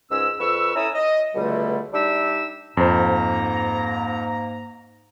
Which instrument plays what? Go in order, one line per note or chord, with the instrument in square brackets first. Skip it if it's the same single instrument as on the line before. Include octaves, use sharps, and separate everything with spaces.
[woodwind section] C#2 G#2 C#4 E6
F2 B4 C#6 E6
C#4 E4 A4 A#5 D#6 E6
D#5
C#2 B2 D3 G3 A3
G3 D4 D#4 E5 E6
[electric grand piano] F2 C5 [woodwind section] G#2 A#3 A#5